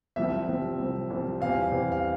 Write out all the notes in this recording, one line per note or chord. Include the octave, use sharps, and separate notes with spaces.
C2 C3 F3 C4 E5
C2 C3 F3 C4
C2 C3 F3 C4
C2 C3 F3 C4
E2 E3 G3 C4 F5
E2 E3 G3 C4
F5